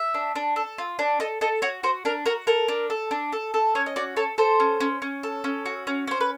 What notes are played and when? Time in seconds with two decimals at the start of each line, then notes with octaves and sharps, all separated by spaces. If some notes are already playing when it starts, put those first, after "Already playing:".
Already playing: E5
0.14 D4
0.36 D4
0.56 A4
0.78 F4
0.99 D4
1.20 A4 D#5
1.41 A4 D#5
1.62 F#4 C#5
1.83 F#4 C5
2.05 D4 A#4
2.26 F#4 A#4
2.47 A4 A#4
2.68 D4
2.90 A4
3.11 D4
3.33 A4
3.54 A4
3.75 C#4 C#5
3.86 D#5
3.96 F#4 D5
4.17 A4 C#5
4.38 A4 C5
4.60 C#4
4.80 C#4
5.02 C#4
5.23 A4
5.44 C#4
5.66 F#4
5.87 C#4
6.07 C#4 C5
6.21 B4